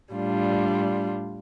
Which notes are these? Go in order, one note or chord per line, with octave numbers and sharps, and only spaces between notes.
A2 G3 D4 F4